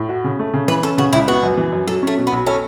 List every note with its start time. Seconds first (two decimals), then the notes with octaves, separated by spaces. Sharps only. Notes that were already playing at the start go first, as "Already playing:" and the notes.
Already playing: A2
0.09 F#4
0.24 C#3
0.39 A3
0.54 C#3
0.68 E3 B4
0.83 C#4 A4
0.98 C#3 F#4
1.13 C#2 E4
1.28 B3 F#4
1.43 F#2
1.58 E3
1.72 F#2
1.87 F#3 A4
2.03 A3 C#4
2.18 B2
2.27 B3
2.32 B1
2.46 C#4 A4